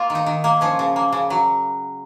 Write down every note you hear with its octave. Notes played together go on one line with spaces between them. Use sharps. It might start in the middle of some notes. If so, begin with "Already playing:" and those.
Already playing: A#3 F4
D#3
D#4
D#3
A#3
F3 C#4
C#3
A#3
C#3
F#3